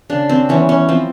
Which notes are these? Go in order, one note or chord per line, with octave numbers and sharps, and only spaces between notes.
C#3 D4
C4
E3 G3 B3 C#4
C#4
F3 C4